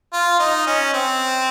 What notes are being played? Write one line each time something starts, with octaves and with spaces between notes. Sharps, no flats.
F4
D#4
C#4
C4